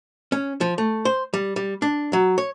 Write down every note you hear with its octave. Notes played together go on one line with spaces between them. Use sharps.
C#4
F3
A3
C5
G3
G3
D4
F#3
C#5